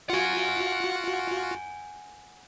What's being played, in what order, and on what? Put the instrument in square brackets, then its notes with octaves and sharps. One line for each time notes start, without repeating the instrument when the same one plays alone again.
[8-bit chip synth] F4 F#4 [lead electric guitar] F#5 G#5